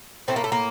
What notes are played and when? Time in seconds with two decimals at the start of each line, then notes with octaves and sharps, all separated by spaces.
0.28 A2 A3 C4
0.36 A#3
0.44 A3
0.52 A#3